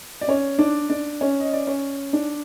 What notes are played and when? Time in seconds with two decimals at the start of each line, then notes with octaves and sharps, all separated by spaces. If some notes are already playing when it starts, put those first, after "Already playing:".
0.21 D5
0.27 C#4 C#5
0.58 D4 D5
0.90 D4 D5
1.21 C#4 C#5
1.40 D#5
1.53 D5
1.67 C#4 C#5
2.13 D4 D5